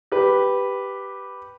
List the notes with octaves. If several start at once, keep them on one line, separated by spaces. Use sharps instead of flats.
G4 B4